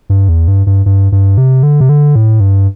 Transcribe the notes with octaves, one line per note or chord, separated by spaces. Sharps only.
G2
E2
G2
G2
G2
G2
C3
D3
C3
D3
A2
G2